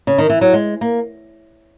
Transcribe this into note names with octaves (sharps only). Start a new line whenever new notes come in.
C#3
D#3
E3
F#3
G#3
A#3